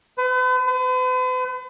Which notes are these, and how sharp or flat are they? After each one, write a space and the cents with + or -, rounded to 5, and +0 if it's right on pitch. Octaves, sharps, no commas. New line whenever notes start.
B4 +40
B4 +45